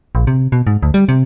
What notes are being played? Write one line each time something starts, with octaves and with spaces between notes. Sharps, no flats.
A#1
C3
B2
G#2
D2
G3
C3